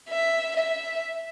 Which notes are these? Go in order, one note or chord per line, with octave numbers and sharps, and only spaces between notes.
E5
E5